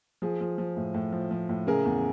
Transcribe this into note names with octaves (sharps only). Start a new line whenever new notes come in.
F3 G#4
F3
F3
A2
A2
F3
F3
A2
C#3 G#4 A#4
E2